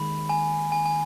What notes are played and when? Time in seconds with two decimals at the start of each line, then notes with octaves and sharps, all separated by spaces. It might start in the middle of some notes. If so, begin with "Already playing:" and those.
Already playing: D#2 D#3 G#3 D#4 B5
0.29 G#5
0.72 G#5
0.86 G#5